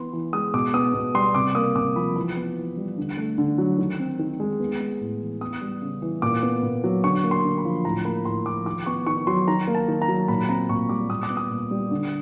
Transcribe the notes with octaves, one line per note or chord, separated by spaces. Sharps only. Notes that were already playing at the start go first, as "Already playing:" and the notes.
Already playing: E3 B3 B5 C6
E3
G#3 D#6
B2 D6
B3 D#6
B2
G3 C6
C3 D6
A#3 D#6
C3 D6
F3 B5
E3 B5
B3
E3
G3
D3
A3
D3
F#3
D#3
C4
D#3
G#3
B3
G#3
A2
E3
B3 D#6
G3
C#3
E3
A#2 D6
B3
A#2
F#3
D3 C#6
A#3
C6
D3
B5
F3
A2 A#5
A#3 B5
A2 C6
F3 D6
D#3 D6
B3 C#6
D#3 C#6
F#3 C6
D#3 A#5
A#3
A5
D#3
A#5
F#3
A#2 B5
C4 A#5
A#2 C#6
G3 D6
A#2 D#6
D6
B3
D#6
A#2
G3
D3